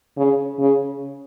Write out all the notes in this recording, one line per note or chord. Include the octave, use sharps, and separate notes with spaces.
C#3
C#3